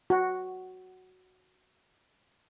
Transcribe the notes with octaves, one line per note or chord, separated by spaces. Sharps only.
F#4